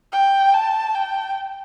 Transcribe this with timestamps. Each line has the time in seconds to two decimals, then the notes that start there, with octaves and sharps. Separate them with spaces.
0.12 G5
0.54 A5
0.95 G5